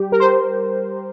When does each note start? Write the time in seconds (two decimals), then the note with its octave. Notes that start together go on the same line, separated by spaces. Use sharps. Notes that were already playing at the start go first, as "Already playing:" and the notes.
Already playing: G3 G4
0.12 A#4
0.20 C5